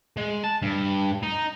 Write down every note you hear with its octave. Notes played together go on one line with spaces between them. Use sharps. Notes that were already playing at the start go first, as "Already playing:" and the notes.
G#3
A5
G2
D#4